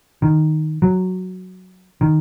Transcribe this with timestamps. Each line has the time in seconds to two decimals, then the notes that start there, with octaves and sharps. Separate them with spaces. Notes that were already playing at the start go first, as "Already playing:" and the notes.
0.22 D#3
0.82 F#3
2.01 D#3